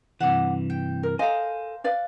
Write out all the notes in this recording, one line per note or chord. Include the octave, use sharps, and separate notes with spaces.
G2 C3 E3 F#5 D6
G5
A#4
A4 A#4 C5 D#5 F5 G#5
B4 D5 F5